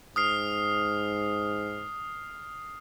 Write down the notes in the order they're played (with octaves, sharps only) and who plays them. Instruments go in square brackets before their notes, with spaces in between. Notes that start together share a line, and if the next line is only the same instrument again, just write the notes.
[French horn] G#2 [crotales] D#6 F6 C7